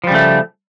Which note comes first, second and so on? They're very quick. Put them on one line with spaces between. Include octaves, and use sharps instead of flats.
F3 G3 C#3 A3